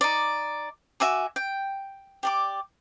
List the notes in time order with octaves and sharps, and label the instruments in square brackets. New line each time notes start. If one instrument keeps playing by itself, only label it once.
[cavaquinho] D#4 D5
F#4 E5 G#5 D6
G5
G4 D5 D6